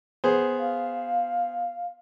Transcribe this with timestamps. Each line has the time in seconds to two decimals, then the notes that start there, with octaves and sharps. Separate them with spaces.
0.24 B3 G#4 C5
0.59 F5